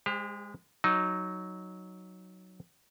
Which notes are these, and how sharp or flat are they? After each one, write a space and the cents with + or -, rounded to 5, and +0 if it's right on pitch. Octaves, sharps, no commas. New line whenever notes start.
G#3 -15 G4 +35 C5 +0
F#3 +0 D#4 +0